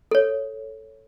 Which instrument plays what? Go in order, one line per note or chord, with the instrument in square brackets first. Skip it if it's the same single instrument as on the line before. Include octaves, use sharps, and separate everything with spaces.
[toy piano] A4 C#5